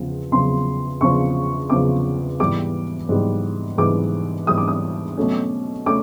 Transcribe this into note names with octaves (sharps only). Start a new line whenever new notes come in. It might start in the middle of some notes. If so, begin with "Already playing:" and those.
Already playing: E2 C#3 F3
E2 C#3 F3 C6
E2 C#3 F3 C#6
E2 C#3 F3 D6
G#2 E3 G3 B3 D6
G#2 E3 G3 B3
G#2 E3 G3 B3 D6
G#2 E3 G3 B3 D#6
D6
D#6
B2 F#3 A3 C#4
A3 C#4 D6